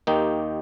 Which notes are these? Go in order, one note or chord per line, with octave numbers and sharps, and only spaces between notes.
D#2 D#3 A#3 D#4 G4